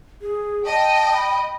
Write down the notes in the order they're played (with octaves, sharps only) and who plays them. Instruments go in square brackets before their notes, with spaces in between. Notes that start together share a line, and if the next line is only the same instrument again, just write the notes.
[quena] G#4
[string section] D#5 G5 [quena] A5
[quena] B5